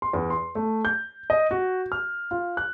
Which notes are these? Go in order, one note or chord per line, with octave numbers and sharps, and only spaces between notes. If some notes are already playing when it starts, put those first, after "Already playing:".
C6
E2
C6
A3
G6
D#5
F#4
F6
F4
F#6